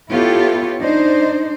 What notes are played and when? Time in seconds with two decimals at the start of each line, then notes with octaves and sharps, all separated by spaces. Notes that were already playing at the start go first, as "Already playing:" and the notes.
0.10 B3 E4 F4 G4 A4 C#5
0.80 D4 D#4 C5